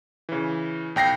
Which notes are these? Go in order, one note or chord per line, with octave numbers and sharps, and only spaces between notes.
C#3 E3
B1 G5 A#6 C7